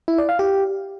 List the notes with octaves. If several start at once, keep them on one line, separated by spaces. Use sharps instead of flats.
E4
D5
F5
G4